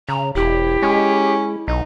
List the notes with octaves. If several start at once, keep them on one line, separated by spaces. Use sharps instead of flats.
C#3 A#5
E1 E4 G4
G#3 C#4
B1 D#4